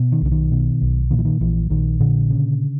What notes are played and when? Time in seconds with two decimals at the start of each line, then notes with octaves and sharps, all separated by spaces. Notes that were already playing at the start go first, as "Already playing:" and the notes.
Already playing: B2
0.12 D#3
0.21 B1 D3
0.32 D#3
0.52 B2
0.81 B1
1.11 A#2 D#3
1.19 E3
1.25 D#3
1.41 A#1 E3
1.70 A#1 D#3
2.00 A#2 D3
2.30 C#3